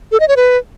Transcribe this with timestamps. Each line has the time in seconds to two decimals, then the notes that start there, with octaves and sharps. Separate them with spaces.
0.12 A4
0.20 D#5
0.28 C#5
0.36 B4